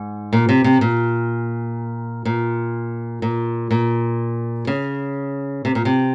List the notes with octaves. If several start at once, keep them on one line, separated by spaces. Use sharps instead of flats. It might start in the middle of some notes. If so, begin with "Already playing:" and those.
Already playing: G#2
A#2
C3
C3
A#2
A#2
A#2
A#2
C#3
C3
A#2
C3